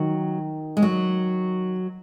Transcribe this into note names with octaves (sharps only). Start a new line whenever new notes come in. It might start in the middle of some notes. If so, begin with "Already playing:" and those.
Already playing: D#3 F#3
G#3
F#3